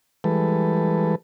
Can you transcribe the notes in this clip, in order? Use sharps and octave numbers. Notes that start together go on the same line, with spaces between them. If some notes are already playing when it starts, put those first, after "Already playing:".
E3 G3 G#3 A4 B4